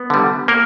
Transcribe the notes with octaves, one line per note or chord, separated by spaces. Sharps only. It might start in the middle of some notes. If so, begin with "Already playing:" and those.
Already playing: B3
D3 G3
A#3 A#4